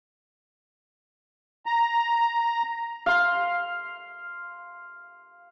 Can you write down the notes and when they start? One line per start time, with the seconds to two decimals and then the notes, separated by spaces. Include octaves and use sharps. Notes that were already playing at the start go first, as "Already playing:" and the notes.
1.66 A#5
3.06 F5 C6